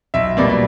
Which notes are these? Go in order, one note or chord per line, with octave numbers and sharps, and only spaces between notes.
B1 E5
B2 G3 A#3 D5
D5